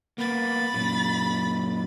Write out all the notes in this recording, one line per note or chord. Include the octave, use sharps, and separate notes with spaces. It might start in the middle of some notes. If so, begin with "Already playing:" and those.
A#3 B3 B5 A6
F#2 A#2